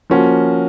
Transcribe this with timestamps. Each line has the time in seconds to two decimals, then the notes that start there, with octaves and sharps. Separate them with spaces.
0.10 F3 A#3 C#4 F#4